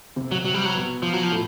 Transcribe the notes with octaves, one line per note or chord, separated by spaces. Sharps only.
C3 C4
F#3
F#3
G3
F#3
B2 B3
F3
F#3
F3
A2 A3